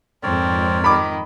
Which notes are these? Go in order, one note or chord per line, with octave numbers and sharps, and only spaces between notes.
F2 G#2 C4 A#4 C#5 D5
D#3 B5 D6